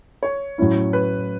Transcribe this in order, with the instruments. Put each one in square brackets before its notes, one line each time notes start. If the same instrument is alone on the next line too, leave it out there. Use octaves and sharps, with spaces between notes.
[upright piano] C#5
[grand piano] A2 F#3 C#4 E4
[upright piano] B4